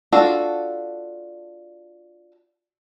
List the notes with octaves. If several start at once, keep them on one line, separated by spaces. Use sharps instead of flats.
D4 F4 F#4 A4